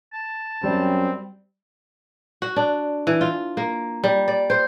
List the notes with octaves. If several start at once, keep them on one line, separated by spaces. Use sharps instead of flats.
A5
F#2 G3 C4
F#4
D4
E3
F4
A#3
G3
D5
C5